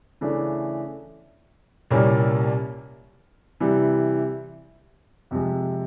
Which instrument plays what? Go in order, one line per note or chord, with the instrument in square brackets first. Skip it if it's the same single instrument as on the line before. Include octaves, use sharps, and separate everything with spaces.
[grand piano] C#3 E3 A3 D4
C2 A#2 G3 A#3 C#4
C3 E3 G3
F2 C3 F3 G#3